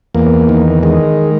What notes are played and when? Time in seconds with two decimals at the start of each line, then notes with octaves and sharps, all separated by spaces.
0.15 E2 A#3
0.49 D#3
0.83 D#3 G#3